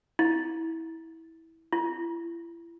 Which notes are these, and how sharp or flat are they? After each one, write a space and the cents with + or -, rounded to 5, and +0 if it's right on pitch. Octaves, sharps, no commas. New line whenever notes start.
E4 -20
E4 +35